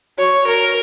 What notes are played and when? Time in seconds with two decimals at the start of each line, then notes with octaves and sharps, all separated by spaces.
0.18 F#4 C#5
0.47 A#4